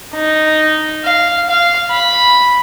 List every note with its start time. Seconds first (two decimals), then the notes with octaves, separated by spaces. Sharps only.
0.15 D#4
1.05 F5
1.49 F5
1.91 B5